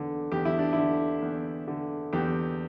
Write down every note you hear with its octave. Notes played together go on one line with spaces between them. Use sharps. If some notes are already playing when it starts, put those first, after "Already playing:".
Already playing: E2 D3
E2 G4
E4
D4
D3 E4
E2
D3
E2 G4